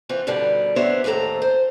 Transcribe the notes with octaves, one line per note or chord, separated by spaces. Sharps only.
E3 C4 F4
G2 B2 D3 D#3 G3
B3 C4 D4 C5 C#5 E5
D#2 A2 C4 A4 A#5
C5